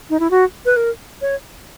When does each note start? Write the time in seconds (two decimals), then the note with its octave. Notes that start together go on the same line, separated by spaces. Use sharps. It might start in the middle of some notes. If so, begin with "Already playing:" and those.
0.10 D#4
0.20 E4
0.31 F#4
0.65 B4
0.76 A#4
1.22 C#5